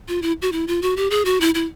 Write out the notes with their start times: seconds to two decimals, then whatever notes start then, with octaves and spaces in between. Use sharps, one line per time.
0.08 F4
0.22 E4
0.42 F#4
0.52 E4
0.67 F4
0.82 F#4
0.97 G4
1.10 G#4
1.25 F#4
1.41 E4
1.55 E4